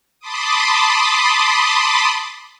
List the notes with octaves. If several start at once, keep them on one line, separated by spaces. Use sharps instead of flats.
A5 B5 C6 D6 D#6